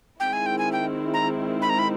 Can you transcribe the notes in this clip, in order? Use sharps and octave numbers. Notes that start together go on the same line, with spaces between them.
D#3 G#3 C4 E4 G5
G#5
G5
G#5
G5
A#5
B5
A#5
B5